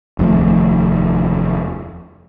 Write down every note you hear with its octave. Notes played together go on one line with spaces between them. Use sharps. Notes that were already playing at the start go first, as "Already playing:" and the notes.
F1 D#2 F3 A3